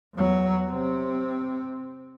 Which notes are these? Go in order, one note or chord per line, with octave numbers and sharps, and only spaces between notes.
E2 F#3
C3 C4